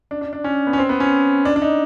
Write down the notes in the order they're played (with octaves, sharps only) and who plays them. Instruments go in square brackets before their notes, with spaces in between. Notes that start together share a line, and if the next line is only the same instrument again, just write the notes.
[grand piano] D4
D4
D4
C#4
B3
C#4
C4
B3
C#4
D4
D4
D#4